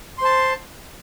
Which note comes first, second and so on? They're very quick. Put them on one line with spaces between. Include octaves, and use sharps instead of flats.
C6 C5 A5